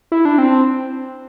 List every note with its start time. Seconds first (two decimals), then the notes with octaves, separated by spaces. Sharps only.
0.12 E4
0.25 D4
0.38 C4